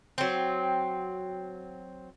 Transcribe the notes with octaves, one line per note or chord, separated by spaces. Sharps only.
F#3 C4